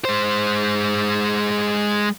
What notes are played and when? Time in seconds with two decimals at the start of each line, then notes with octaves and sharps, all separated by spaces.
0.05 G#3 C5